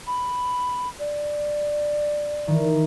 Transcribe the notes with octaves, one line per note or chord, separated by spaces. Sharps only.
B5
D5
D#3 E3